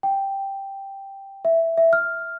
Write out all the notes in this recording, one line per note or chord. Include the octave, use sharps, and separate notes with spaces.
G5
E5
E5
F6